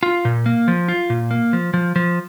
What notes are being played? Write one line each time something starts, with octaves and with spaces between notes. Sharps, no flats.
F4
A#2
A#3
F3
F4
A#2
A#3
F3
F3
F3